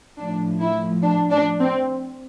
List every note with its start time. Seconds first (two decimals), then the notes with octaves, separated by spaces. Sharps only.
0.18 A2 F3 D4
0.60 E4
1.03 D4
1.31 D4
1.60 C4